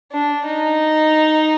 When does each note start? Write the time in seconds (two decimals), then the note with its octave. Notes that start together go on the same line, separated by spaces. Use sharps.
0.12 D4
0.46 D#4